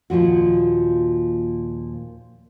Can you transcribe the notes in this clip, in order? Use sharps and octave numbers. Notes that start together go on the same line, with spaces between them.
D#2 A#2 F3 F#4